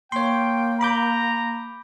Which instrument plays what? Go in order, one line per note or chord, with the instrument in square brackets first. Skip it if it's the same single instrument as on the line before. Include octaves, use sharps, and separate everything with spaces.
[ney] A#3 [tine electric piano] C#5 C6 [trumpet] G5
[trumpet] A#5 [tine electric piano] B5 D6 G6